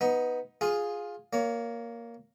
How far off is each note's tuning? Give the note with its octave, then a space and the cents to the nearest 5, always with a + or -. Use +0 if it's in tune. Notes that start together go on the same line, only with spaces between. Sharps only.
B3 +0 D#4 +15
F4 +15 G#4 +0
A#3 +0 C#5 +30